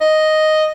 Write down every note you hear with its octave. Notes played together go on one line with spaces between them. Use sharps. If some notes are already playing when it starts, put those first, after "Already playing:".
D#5